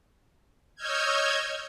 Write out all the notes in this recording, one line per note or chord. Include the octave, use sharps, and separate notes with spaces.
C#5 D#5 E6 F6 G6 G#6